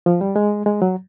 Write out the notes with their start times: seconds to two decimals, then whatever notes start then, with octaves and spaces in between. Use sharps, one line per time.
0.06 F3
0.21 G3
0.36 G#3
0.66 G#3
0.82 F#3